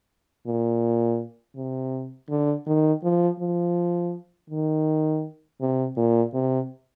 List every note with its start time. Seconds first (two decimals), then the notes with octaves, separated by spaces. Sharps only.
0.46 A#2
1.56 C3
2.29 D3
2.67 D#3
3.03 F3
3.39 F3
4.50 D#3
5.61 C3
5.97 A#2
6.34 C3